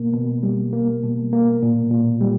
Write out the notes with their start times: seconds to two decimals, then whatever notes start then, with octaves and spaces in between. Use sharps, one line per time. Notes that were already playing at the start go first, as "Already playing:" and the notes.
Already playing: B2 A#3
0.13 B2
0.43 G3
0.73 A#3
1.03 B2
1.33 A#3
1.63 A#2
1.91 A#2
2.21 G3